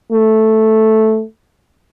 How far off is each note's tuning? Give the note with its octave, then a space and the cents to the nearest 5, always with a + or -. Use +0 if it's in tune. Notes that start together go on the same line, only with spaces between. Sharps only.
A3 -5